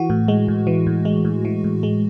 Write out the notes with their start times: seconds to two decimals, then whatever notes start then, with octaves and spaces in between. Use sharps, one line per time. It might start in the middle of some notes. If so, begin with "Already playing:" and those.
Already playing: E3 F#4
0.10 A2
0.28 G#3
0.48 A2
0.67 E3
0.87 A2
1.05 G#3
1.25 A2
1.45 E3
1.64 A2
1.83 G#3